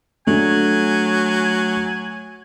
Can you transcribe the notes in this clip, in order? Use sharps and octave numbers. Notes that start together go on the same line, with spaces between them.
F#3 A3 D4 G#5